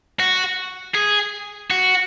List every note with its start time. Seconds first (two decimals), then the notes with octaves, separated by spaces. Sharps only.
0.19 F#4
0.94 G#4
1.70 F#4